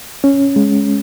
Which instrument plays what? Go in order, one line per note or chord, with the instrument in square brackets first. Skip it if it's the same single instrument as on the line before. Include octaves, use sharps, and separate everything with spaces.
[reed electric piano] C#4
G#3